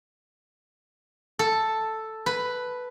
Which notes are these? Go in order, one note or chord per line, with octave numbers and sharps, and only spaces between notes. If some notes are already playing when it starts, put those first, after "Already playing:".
A4
B4